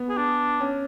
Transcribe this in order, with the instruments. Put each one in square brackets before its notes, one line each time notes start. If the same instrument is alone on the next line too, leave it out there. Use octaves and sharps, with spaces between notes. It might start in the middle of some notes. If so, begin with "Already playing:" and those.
Already playing: [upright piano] B3
[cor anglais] G#4
D4
[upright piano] C#4